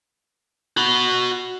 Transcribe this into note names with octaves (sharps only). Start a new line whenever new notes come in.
F#4 B5